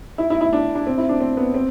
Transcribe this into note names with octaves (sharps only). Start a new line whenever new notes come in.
E4
E4
E4
D4
D4
C4
E4
D4
C4
B3
C4